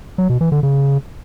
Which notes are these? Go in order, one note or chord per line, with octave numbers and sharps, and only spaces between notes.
F#3
B2
E3
D3
C#3